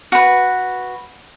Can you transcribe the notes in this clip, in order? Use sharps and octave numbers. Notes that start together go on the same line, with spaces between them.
F#4 B4